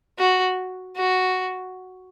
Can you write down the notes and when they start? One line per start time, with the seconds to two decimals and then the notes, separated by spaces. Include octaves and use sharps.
0.19 F#4
0.96 F#4